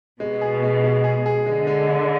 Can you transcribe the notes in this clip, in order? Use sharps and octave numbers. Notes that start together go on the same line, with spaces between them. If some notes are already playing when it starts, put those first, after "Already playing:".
B2 G#3
G#4
G#3
G#3
G#4
G#4
D3 G#3
G#3
G#3